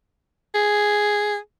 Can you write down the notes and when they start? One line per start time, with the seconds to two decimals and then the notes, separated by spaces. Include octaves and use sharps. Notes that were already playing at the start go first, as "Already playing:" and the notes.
0.55 G#4